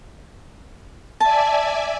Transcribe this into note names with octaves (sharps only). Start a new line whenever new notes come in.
D5 E5 G#5 A5